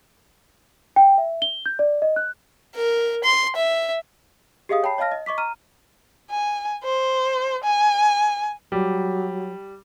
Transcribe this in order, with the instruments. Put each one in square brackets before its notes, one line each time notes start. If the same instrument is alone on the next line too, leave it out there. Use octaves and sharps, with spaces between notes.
[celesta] G5
E5
G7
G6
D5
D#5
F#6
[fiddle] A#4
C6
E5
[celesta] G4 G#4 D#5 F5 D#6
C#5 G5 A5 B5 C7
C#5 D#5 F5 A5 F6 A#6
D#5
D#5 C#6 D6 B6
A#5 F6 D#7
[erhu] G#5
C5
G#5
[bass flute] F#3 [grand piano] G3